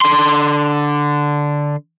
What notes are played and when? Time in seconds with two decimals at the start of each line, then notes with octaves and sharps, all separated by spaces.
0.01 D3 C6